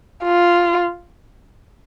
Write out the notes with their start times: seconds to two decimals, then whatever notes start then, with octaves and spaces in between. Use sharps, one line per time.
0.24 F4